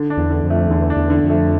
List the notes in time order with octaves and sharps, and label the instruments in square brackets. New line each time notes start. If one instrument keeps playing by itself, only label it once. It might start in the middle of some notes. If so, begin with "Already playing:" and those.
Already playing: [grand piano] D3
D4
[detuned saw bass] E2
[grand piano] D3
[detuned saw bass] F2
[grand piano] A3
[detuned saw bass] E2 [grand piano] D3
[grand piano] D4
[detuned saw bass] E2
[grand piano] D3
[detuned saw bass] F2
[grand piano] A3